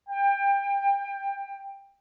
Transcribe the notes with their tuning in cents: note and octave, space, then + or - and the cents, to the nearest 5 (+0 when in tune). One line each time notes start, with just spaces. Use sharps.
G5 +20